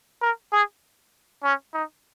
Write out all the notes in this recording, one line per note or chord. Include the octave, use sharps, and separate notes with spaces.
A#4
G#4
C#4
D#4